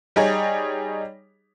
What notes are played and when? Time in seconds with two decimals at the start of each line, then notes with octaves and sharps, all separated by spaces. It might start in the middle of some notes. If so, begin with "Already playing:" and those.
0.16 G3 D#4 G#4 C#5